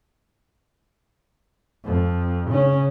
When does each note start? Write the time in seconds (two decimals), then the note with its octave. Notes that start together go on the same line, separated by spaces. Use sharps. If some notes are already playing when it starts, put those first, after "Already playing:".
1.85 F2
2.50 C#3 C#4